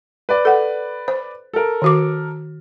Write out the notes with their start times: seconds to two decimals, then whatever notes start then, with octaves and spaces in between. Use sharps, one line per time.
0.29 B4 D5
0.45 A4 F#5
1.08 C5
1.53 A4 A#4
1.82 D#3 F#4 D6